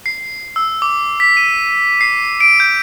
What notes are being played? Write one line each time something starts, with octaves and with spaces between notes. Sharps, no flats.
C7
E6
D6
B6
D#7
C7
D7
G6